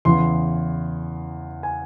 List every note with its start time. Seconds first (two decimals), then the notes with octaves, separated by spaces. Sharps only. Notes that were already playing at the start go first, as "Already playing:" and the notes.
0.05 E2 C#3 E3 C6
1.63 G#5